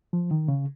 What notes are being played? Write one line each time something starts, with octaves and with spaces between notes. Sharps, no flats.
F3
D#3
C#3